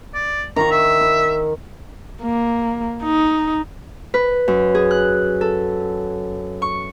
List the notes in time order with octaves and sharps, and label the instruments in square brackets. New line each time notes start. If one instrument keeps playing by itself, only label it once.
[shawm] D5
[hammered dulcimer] D#3 B5 C#6 [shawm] A#5
[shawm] E5
[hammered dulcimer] B5
[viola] A#3
D#4
[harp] B4
F#2
G#4
F#6
A4
C#6